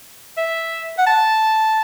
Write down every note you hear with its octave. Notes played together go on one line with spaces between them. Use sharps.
E5
F#5
A5